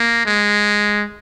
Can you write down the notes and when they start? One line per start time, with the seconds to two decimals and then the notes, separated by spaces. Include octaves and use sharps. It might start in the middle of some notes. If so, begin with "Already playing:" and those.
Already playing: A#3
0.26 G#3